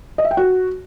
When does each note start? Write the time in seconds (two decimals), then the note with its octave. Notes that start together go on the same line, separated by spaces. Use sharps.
0.18 D#5
0.25 E5
0.31 G5
0.37 F#4